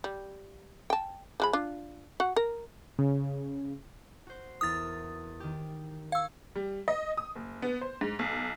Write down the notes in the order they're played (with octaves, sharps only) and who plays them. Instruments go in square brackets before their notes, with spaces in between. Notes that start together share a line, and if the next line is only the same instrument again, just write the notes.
[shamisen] G3
G5 A5
F3 G#3 B5
D4 F4
F#4 F#5
A#4
[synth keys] C#3
[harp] F#4 C5
[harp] E2 E4 A#4 [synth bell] D#6 A6
[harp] D#3 G4
[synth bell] F5 E6 [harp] C#6 G#6
[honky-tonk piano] G3
D#5
D#6
F#1
B3
C5
G#2
B1